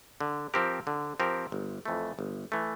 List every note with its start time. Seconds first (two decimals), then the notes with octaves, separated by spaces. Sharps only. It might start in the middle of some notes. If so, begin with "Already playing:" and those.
0.21 D3
0.54 F3 C4 G4 A#4
0.87 D3
1.20 F3 C4 G4 A#4
1.52 G1
1.86 F2 E3 A3
2.19 G1
2.52 E3 A3